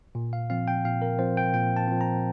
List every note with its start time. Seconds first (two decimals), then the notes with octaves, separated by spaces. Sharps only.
0.15 A#2
0.33 F5
0.50 F3 C4 F5
0.68 G5
0.85 A#2 F5
1.02 A#4
1.19 F3 C4 C5
1.37 G5
1.54 A#2 G5
1.76 A5
1.88 F3 C4
2.01 A#5